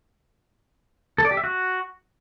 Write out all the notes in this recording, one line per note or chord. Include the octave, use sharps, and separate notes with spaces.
A4
D5
G4
E5
F#4